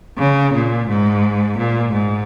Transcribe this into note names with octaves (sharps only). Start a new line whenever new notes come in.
C#3
A#2
G#2
A#2
G#2